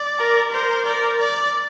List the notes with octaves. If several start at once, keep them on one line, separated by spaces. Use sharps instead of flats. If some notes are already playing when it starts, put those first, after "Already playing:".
Already playing: D5
A#4
A#4 C5
A#4 D5
D5